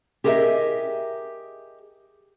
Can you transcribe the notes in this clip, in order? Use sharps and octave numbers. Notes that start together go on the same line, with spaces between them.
G4 G#4 A#4 D#5 E5